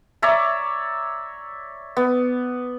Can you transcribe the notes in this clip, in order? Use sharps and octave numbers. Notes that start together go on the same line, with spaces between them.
C#5 D5 E5 A#5
B3